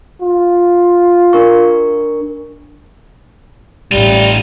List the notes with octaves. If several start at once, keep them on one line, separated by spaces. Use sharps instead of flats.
F4
D4 A#4 C#6
A1 G3 D#4 F4